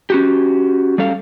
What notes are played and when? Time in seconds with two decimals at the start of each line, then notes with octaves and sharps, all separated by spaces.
0.10 C#4 F#4 G4
0.98 G3 C#4 A4 F5